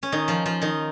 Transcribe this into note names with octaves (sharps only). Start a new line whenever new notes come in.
C#4
D#3 D#4
F3 F4
F3 F4
D#3 D#4